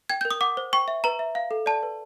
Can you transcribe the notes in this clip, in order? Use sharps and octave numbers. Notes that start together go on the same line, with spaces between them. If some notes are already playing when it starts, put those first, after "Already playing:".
G5 G#6
A#4 G6
D#6
F#5 D6
C5
G5 C#6
E5
B4 A#5
E5
F5
A4
D5 A5
B4